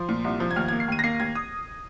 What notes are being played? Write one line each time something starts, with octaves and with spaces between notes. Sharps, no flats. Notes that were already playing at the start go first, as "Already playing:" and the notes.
Already playing: F3 C6
A#2
C2
F3
G#6
D#2 F6
A#3 G#6
C7
D#2 D#7
A#6
A#3 C7
D#2 G#6
D#6